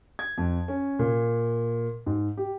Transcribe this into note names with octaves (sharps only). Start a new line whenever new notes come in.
G#6
F2
C#4
A#2
G#2
G4